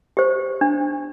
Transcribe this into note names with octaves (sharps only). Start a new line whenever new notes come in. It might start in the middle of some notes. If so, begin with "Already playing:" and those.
G4 C5
D4